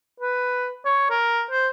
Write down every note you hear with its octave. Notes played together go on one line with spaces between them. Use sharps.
B4
C#5
A#4
C5